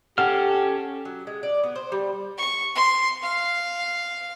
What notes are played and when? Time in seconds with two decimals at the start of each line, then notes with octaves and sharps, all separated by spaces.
0.18 C#4 G4 A4 F#5 F6
1.05 F#3
1.27 G#3
1.43 D5
1.64 B3
1.76 C5
1.92 G3
2.38 C#6
2.75 C6
3.23 F5